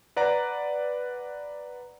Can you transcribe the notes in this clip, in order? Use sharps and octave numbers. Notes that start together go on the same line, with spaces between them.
B4 D5 F#5 A#5